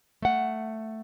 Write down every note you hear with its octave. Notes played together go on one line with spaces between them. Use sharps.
A3 F#5